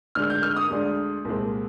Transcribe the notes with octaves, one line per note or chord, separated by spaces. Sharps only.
D2 D3 G#3 D4 F6
G6
F6
D#6
D2 D3 G#3 D4
C2 A#2 G#3 C4